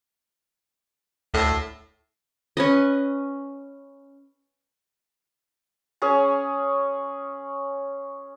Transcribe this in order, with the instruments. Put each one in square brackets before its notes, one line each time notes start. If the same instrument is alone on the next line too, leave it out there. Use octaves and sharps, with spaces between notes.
[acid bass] D2 [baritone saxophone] A2
[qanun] C#4 B4 D#5
[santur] C#4 G#4 C#5